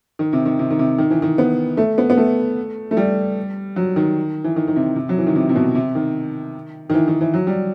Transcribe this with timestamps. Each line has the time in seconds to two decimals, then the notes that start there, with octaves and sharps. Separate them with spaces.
0.19 D#3
0.33 C3
0.45 D#3
0.59 C3
0.70 D#3
0.79 C3
0.98 D#3
1.10 E3
1.22 D#3
1.38 B3
1.77 A3
1.98 B3
2.10 B3
2.17 A3
2.91 A3
2.97 G3
3.76 F#3
3.96 D#3
4.44 E3
4.56 D#3
4.68 D#3
4.76 C3
4.96 C3
5.09 F#3
5.19 E3
5.27 D#3
5.35 C3
5.49 C3
5.56 B2
5.75 C3
5.95 D#3
6.90 D#3
6.94 E3
7.08 D#3
7.21 E3
7.34 F#3
7.47 G3